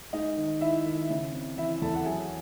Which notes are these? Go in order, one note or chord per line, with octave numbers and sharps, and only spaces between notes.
G#3 D#4 D#5
D#3
D#4 E4 E5
D#3
C#3
C4
E3 E4 E5
E2 A4 A5
F#5
F#3 G#4 G#5